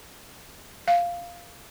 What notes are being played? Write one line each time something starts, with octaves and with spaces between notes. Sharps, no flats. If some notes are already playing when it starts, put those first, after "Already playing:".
F5